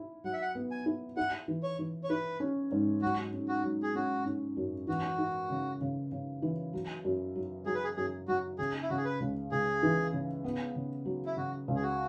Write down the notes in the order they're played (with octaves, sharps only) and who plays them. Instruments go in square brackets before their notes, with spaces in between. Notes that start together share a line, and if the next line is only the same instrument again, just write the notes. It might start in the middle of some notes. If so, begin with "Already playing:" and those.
Already playing: [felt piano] E4
[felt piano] F#3 [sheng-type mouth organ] F#5
[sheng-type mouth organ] E5
F#5
[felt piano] B3
[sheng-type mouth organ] G#5
[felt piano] E4
[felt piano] E4 [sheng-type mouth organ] F#5
[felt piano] E3
[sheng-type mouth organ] C#5
[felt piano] E3
[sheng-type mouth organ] C#5
[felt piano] E4 [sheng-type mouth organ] B4
[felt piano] C#4
G#2
[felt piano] F#3 [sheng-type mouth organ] F#4
[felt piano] C#4
[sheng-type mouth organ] F#4
[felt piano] F#3
[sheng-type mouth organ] G#4
[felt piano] C#4 [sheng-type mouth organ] F#4
[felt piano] C#4
F#2
[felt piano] E3 [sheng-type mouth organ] F#4
[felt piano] E4
C#3
C#3
C#3
E3
F#3
F#2
F#3
[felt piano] F#3 [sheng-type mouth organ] G#4
[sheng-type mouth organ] B4
G#4
[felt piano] F#2 [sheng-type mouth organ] G#4
[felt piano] F#3 [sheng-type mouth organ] F#4
[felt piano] C#3 [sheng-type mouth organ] G#4
[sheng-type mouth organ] E4
[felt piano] C#3 [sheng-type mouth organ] F#4
[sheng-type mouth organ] G#4
B4
[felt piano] C#2
[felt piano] C#2 [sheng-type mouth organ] G#4
[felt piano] E3
C#3
B3
C#3
F#3
[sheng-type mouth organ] E4
[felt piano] C#3 [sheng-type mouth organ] F#4
[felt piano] C#2
[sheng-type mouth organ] G#4
F#4